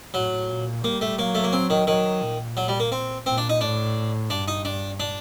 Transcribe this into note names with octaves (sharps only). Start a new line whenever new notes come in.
A2 F#3
A#2
G3 A#3
A3
F#3 A#3
A3
A#3
C4
D#3
D#3 F#3
A#2
F#3
G3
A#3
C4
A#2 C4
D4
D#4
A2 D4
G2 D4
D#4
D4
D4